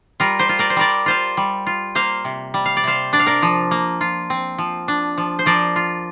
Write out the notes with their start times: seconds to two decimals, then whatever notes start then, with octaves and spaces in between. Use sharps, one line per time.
0.20 G3 F4 A#4
0.39 G4 C5
0.49 F4
0.59 A#4 D5
0.70 C5
0.76 G3 A#4 D5
1.06 F4 C5 F5
1.37 G3
1.66 F4
1.95 A#3 C5 F5
2.25 C3
2.54 G3
2.65 F5
2.77 D5
2.84 C3 C5 F5
3.13 D4 D5
3.19 F5
3.26 A#4 D5
3.42 F3
3.71 A#3
4.01 F4
4.30 C4
4.58 F3
4.88 D4
5.17 F3
5.39 C5
5.46 F3 A#4 D5
5.76 F4